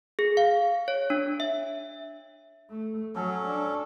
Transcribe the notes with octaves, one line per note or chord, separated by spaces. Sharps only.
G#4
F5
C#5
D4
E5
A3
F#3 C#4 A4
D4